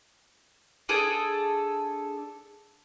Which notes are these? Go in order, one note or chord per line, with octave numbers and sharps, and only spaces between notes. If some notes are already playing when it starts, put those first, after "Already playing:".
D4 G#4 A4